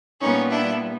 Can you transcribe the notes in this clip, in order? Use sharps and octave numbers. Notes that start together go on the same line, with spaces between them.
A#2 G3 B3 C#4 D#4
D4 E4